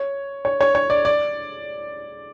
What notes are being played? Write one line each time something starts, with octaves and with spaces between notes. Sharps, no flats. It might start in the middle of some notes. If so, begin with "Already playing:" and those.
Already playing: C#5
C#5
C#5
C#5
D5
D5